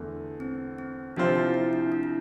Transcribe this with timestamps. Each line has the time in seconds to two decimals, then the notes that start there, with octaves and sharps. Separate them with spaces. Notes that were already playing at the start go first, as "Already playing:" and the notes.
Already playing: E2 D3 A3
0.40 C4
0.78 C4
1.16 C3 F3 C4 D4 F4 C5
1.36 E4
1.54 E4
1.73 D4
1.92 D4
2.03 E4